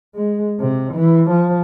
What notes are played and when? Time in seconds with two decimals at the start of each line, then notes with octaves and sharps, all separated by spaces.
0.15 G#3
0.59 C3
0.93 E3
1.30 F3